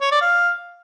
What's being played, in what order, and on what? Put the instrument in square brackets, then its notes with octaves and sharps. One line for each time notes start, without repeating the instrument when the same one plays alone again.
[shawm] C#5
D5
F5